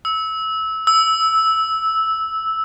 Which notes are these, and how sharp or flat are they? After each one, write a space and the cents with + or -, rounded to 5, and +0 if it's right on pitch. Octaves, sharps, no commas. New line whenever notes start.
E6 -20
E6 -10